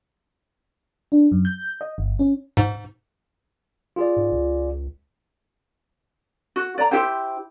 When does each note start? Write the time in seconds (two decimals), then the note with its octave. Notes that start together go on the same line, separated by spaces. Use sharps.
1.12 D4
1.32 F#2
1.45 G6
1.81 D#5
1.98 G1
2.19 C#4
2.57 G#2
3.96 F4 G#4 D5
4.16 G#2
4.32 C#2
6.56 F#4
6.78 D5 A#5
6.91 E4 G4 C5 G5